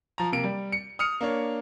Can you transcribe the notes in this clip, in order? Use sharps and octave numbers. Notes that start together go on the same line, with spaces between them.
F3 A#5
C3 A#3 D7
G3
C#7
D#6 F6 C#7
A#3 D4 C#5